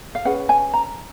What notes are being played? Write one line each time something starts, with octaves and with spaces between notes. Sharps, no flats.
F5
C#4 G#4 B4 F#5
G#5
A#5